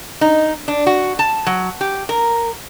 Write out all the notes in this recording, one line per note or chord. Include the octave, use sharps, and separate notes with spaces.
D#4
D4
F#4
A5
F#3
G4
A#4